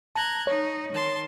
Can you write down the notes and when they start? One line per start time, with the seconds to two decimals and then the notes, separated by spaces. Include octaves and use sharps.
0.15 A5 A#5 F#6 G#6
0.47 D#4 C#5
0.91 D#3 A5 C6